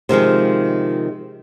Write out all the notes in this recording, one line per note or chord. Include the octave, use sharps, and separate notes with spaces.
C3 D#3 F3 G#3